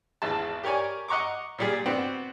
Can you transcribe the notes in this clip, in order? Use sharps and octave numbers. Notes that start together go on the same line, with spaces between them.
G#1 E2 A5
G4 A#4 C#5 D5 G#5
D#5 F#5 A#5 C#6 D6
A#2 G3 G#4
B3 C4 D4 F#4